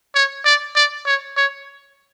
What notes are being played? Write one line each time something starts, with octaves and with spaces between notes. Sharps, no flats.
C#5
D5
D5
C#5
C#5